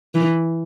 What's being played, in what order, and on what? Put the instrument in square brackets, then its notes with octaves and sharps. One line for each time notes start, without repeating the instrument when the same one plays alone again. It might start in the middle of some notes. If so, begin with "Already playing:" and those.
[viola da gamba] E3